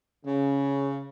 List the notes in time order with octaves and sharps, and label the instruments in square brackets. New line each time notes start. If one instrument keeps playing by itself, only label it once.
[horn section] C#3